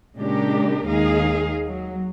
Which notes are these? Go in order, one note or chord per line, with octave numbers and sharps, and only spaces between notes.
A#2 C#3 G#3 D4 G4 A#4
D#2 D#3 G#3 D#4 G#4 F5
F#3